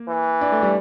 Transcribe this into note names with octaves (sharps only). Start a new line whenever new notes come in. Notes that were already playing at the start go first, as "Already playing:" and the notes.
Already playing: A#3
E3
D4
A3
G3